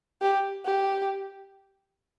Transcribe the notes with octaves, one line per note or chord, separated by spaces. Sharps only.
G4
G4